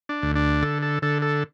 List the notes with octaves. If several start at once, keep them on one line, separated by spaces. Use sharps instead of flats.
D4
D2
D4
D3 A4
A4
D3 A4
A4